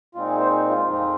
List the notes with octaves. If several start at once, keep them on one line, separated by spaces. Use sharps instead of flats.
A#2 G#3 C4 D#4 F4
G#4
C5
F4
F2 F3 G#3 C4 D#4